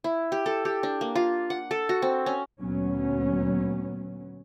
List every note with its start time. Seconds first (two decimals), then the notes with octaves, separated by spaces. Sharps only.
0.04 E4
0.32 G4
0.46 A4
0.65 G4
0.83 D4
1.01 A#3
1.15 F4
1.50 F#5
1.71 A4
1.89 F#4
2.02 C4
2.26 C#4
2.61 D2 A#2 F#3 B3 C#4